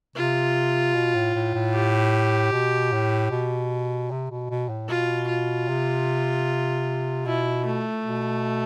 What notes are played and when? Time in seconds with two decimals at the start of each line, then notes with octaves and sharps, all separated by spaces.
0.16 C3 F4
0.94 B2
1.15 A2
1.35 A2
1.54 A2
1.73 G4
2.52 B2
2.92 A2
3.31 B2
4.10 C3
4.30 B2
4.50 B2
4.69 A2
4.88 B2 F4
5.28 F4
5.68 C3
7.25 B2 E4
7.65 A3
8.04 B2